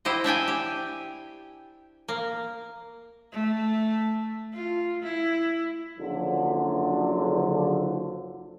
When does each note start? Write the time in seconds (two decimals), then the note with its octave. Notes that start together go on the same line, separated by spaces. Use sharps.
0.05 E4 G4 C5 D#5
0.24 D4 E5 G5 G#5
0.48 G4
2.08 A#3
3.32 A3
4.53 F4
5.02 E4
5.98 F#1 D3 F3 F#3